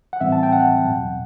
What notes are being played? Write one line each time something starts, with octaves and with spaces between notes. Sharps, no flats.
F#5
A2 E3 G3 C4 E5
A5
G5
F#5
E2 B2 F#3